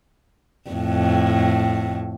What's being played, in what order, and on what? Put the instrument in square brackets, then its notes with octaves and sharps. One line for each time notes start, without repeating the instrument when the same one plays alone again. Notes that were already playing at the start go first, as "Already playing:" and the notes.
[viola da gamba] F2 A2